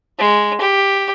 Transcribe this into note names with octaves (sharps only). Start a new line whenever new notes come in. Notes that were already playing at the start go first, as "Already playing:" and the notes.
G#3
G4